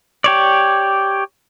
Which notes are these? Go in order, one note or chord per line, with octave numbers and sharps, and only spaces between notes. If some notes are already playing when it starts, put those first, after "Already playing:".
G4 C#5 D5